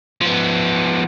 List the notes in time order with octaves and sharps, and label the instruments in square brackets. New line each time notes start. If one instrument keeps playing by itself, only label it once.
[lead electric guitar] F3 B3